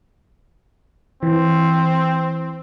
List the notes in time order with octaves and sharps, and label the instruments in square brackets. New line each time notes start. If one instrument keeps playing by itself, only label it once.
[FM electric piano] E3 [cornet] C4